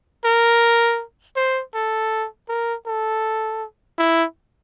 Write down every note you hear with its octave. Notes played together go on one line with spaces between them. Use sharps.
A#4
C5
A4
A#4
A4
E4